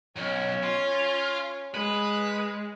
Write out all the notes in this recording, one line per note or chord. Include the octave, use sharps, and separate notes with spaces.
B1 C#4
F4
G#3 B4